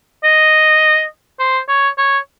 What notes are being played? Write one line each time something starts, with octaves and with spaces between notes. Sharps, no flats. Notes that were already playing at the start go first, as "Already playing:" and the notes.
D#5
C5
C#5
C#5